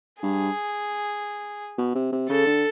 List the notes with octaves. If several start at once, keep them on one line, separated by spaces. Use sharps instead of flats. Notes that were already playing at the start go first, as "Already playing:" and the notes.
G2 G#4
B2
C3
C3
C#3 A4
D3